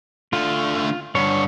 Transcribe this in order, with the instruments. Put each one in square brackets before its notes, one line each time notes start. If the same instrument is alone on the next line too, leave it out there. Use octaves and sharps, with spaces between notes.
[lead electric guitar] D3 A3 [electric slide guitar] F4
[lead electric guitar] G2 D3 [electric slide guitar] C#5